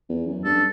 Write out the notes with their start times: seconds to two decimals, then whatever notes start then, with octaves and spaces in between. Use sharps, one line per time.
0.09 E2
0.27 F#2
0.44 G2 A4